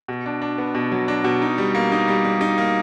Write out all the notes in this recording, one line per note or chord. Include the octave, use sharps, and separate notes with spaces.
B2
D4
D4
B3
B2
F#3
D4
B2
D#4
G3
A#3
D#4
G3
G3
D#4
A#3